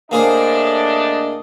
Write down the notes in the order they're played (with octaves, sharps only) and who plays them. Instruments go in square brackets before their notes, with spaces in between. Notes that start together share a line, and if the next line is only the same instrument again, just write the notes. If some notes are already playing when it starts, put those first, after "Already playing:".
[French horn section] A2 D4 D#5 [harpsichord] A#3 G#4 C5